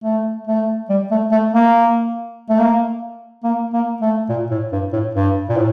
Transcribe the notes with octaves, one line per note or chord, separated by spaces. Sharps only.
A3
A3
G3
A3
A3
A#3
A3
A#3
A#3
A#3
A3
A#2
A2
G2
A2
G2
A#2
A2